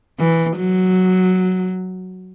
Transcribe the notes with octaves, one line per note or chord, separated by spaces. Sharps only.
E3
F#3